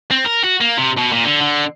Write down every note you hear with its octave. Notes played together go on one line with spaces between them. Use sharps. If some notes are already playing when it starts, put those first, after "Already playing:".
C4
A#4
F#4
A#3
C3
B2
A#2
D3
D3